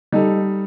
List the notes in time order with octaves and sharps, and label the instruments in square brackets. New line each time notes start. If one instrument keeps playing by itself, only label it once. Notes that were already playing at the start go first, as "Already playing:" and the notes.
[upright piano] G3 D#4 A4